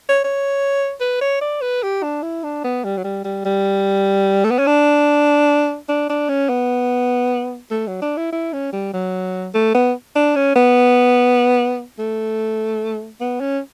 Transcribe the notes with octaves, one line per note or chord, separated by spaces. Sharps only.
C#5
C#5
B4
C#5
D5
B4
G4
D4
E4
D4
B3
G3
F#3
G3
G3
G3
A3
B3
C#4
D4
D4
D4
C#4
B3
A3
F#3
D4
E4
E4
C#4
G3
F#3
A3
B3
D4
C#4
B3
A3
B3
C#4